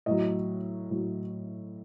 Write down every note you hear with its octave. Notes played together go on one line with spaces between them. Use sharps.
A2 F#3 D#5
A2 F#3